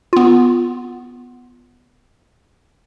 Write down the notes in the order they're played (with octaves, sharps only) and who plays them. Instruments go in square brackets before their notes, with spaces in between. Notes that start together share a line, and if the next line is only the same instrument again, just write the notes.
[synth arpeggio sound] B3 F4